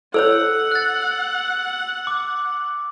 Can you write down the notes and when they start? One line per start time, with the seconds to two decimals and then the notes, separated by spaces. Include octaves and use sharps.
0.14 A4 C5 C#5 F#5 E6
0.71 F#6 A6
2.07 D6